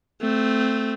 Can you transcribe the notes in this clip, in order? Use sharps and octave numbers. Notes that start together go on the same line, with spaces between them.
A3 C4